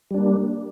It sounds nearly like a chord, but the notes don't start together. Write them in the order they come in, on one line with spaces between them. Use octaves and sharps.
G3 D4 A#3